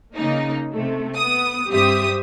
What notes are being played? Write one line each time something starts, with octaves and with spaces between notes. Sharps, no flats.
C#3 A#3 D#4
C3 A3
B3 D#6
G2 C4 G4 E5 D#6